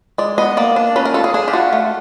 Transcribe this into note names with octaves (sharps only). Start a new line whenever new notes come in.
G#3 D5
B3 D#5
A#3 D5
D4
C#4 B4
A#4
F4 A4
G#4
D4 G#4
G4
F4 F#4
A3